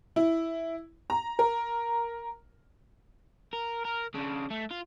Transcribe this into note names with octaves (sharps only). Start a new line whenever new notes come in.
E4
A#5
A#4
A#4
A#4
C#3 D4
A3
F4